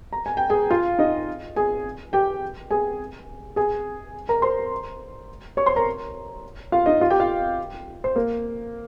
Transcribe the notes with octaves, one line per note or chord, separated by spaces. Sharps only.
A#5
G#5
G5
G#4 G#5
F4 F5
D#4 D#5
G#4 G#5
G4 G5
G#4 G#5
G#4 G#5
A#4 A#5
C5 C6
C#5 C#6
C5 C6
A#4 A#5
F4 F5
D#4 D#5
F4 F5
G4 G5
F4 F5
C5
A#3 A#4